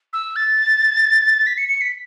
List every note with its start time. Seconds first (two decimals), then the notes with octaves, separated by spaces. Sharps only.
0.13 E6
0.36 A6
1.46 B6
1.57 C#7
1.68 C#7
1.81 B6